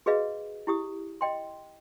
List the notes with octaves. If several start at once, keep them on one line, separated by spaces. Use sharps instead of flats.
F#4 G#4 B4 D#5 F5
E4 G4 D#6
D#5 G5 C6